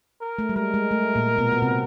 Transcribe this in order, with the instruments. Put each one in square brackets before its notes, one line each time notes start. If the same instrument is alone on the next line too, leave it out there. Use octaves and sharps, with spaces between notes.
[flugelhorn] A#4
[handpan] A3
G3
[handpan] G#3 [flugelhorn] A#4
[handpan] G#3
A3
A#2 A#3
B2 B3
B3
C3 C4